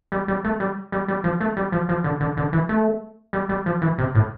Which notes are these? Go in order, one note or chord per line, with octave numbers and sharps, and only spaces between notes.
G3
G3
A3
G3
G3
G3
F3
A3
G3
F3
F3
D3
D3
D3
E3
A3
G3
G3
F3
E3
C3
A2